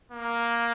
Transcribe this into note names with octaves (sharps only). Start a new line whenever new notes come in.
A#3